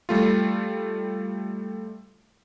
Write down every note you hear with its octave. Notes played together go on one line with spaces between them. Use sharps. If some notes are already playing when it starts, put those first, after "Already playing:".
G3 A3 F4